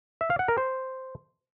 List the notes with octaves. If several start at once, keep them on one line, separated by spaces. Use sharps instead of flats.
E5
F5
F#5
A#4
C5